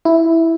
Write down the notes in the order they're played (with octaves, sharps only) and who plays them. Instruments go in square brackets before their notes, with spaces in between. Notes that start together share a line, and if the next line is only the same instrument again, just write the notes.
[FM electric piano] E4